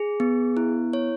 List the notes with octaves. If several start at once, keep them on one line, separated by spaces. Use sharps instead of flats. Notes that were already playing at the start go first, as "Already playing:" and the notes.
Already playing: G#4
B3
E4
C#5